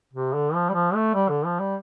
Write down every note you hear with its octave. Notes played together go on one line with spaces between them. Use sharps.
C3
D3
F3
G3
F3
A3
G3
D3
F3
G3